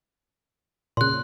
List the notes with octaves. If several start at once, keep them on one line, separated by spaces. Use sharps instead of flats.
A#2 C#3 C6 F#6